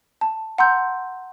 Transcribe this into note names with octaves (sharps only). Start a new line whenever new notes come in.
A5
F#5 A#5 C6 E6 G6